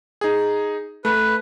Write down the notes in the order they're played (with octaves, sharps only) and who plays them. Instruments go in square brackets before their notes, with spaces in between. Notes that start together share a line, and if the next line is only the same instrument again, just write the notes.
[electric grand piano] D#4 G#4
[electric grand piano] A3 [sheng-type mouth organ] B4